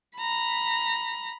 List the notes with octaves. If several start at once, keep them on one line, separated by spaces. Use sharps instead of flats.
A#5 B5